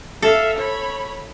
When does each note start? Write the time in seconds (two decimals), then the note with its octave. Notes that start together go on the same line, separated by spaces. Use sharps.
0.22 A4 E5 F5
0.58 C#5 B5